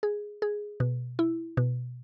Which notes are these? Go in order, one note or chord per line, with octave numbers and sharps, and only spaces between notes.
G#4
G#4
B2
E4
B2